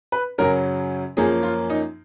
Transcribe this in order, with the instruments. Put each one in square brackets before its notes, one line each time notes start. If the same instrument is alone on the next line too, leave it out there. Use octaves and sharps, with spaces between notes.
[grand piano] B4
F#2 C#3 F#3 C#4 A#4
F#2 F3 A#3 C#4 G#4
F4
D#4